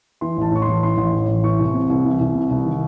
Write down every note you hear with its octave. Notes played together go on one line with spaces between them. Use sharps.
E3 C6
A1 A5
A2 C#6
C6
A1
E3 C6
A1
A2
A1
E3 C#6
C2
C3
C2
E3
C2
C3
C2
D#3